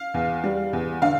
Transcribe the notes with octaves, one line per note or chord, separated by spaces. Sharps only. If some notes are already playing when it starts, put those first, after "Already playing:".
Already playing: F5
E2
G3
E2
D3 F5